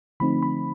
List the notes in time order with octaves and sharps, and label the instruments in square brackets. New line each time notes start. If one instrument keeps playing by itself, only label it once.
[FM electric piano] D3 F3 A3 C4 D#4 B5
B5